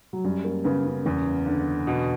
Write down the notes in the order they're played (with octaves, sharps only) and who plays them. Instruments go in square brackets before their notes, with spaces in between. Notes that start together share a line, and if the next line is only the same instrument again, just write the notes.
[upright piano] F#3
[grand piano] F#2 [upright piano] G3
[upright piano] A#3
[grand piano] C#3 [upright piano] B3
[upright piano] C#4
[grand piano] E2 [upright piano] B3
[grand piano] D3
B2